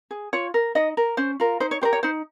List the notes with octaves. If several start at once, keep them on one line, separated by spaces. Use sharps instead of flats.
G#4
F4 C#5
A#4
D#4 D#5
A#4
C#4 C5
F4 A#4
D#4 C5
C#5
G4 A#4 C5
C#5
D#4 C5